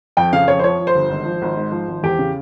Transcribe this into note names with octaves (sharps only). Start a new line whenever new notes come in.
F2 G5
C#3 F5
F2 C#5
C5
F3 C#5
F3
C5
G1
G#1
F3
G#1
G#2
F3
G#1
E2 G4
C#3